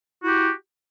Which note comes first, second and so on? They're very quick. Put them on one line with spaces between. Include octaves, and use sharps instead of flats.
E4 F#4 G4